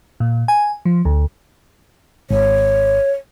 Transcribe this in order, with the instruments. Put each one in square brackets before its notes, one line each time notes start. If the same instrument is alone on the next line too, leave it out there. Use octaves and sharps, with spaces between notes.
[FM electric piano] A#2
G#5
F3
D2
[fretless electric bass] G#1 [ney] C#5